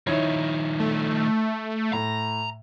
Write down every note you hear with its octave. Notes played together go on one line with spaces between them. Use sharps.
D#3 F3 D#4 E4 C#5
A3
A2 A#5